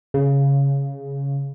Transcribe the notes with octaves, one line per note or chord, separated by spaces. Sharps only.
C#3